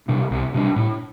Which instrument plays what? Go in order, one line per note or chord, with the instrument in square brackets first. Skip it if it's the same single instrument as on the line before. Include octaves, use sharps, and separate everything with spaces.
[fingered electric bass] C3 G3 D4
C2
C3 G3 D4
A2